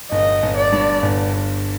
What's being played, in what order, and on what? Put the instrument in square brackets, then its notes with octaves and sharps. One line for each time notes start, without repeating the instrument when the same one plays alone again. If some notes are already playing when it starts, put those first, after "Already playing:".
[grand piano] G1 [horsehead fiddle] D#5
[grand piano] G1
[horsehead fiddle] D5
[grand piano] G2
G1
G1